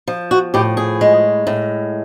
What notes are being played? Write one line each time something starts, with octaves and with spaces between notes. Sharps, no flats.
F3
F#4
A2 G4
G#4
G#3
A2